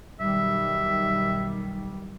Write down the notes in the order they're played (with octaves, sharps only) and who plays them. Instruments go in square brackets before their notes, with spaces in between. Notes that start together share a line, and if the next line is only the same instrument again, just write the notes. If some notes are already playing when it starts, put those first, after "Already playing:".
[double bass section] B1 D#3 G3 [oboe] E5